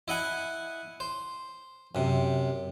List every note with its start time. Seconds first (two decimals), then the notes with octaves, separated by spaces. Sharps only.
0.08 E4 D#5 F#5 G#5
1.00 C5
1.95 F#2 C3